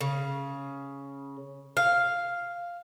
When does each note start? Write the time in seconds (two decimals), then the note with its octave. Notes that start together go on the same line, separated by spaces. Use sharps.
0.01 C#3
1.77 F5